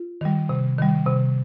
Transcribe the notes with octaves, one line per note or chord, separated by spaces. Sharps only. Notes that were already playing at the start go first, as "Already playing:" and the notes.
Already playing: F4
D#3 G3
C3
D#3 G3
C3